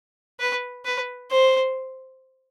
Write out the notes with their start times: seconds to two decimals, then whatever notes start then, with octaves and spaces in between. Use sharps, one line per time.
0.40 B4
0.85 B4
1.31 C5